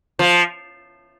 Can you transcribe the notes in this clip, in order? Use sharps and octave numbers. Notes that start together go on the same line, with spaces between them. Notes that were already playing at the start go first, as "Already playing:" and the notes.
F3